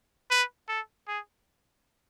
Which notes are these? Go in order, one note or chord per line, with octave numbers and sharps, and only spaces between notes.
B4
A4
G#4